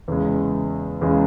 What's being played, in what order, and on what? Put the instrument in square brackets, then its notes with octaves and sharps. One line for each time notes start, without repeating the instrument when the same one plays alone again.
[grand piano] E2 C#3 G#3
E2 C#3 G#3